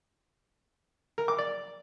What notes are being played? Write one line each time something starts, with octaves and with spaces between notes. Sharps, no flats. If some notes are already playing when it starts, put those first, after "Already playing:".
A#4
D6
D5